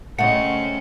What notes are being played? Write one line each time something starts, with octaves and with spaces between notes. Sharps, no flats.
C#3 A3 C4 C#4 D#5 F#5 C#7